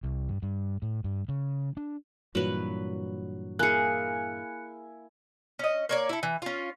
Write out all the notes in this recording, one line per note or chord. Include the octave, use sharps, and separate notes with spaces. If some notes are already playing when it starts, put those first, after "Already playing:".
C2
G2
G2
A2
G2
C#3
D4
G2 A#2 E3 F#3 B4
A#3 E4 G#4 G#5 F#6 C#7
C#4 D#5
A#3 C#5 D5
E4 A4
E3
C#4 F4